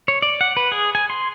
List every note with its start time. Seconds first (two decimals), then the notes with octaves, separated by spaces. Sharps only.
0.08 C#5
0.22 D5
0.41 F#5
0.57 B4
0.72 G#4
0.95 G#5
1.10 C6